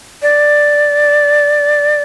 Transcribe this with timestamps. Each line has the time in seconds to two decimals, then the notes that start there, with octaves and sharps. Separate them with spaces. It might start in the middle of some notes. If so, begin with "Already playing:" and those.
0.22 D5